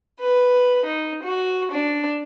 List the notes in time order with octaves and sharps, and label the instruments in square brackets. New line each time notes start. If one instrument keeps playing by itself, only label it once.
[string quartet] B4
D#4
F#4
D4